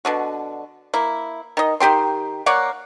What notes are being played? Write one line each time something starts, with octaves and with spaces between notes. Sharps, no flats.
B2 D3 F#4
A#3 E4
D#3 D#5
D#3 G4 G5 C6
A#3 C#5 D5 F#5